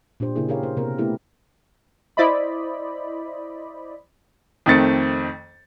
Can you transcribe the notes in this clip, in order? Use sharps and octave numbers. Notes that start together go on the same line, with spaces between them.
A#2 D4 G4 C5
C#3 A#3 E4 G#4
G4 G#4 A#4 C#5 F5
A#3 C5
C3 A#3 B3 A#4
A3 B3 E4 G4 A4
E4 C5 D5 D#5 B5
F2 D#3 A3 C4 A6 C#7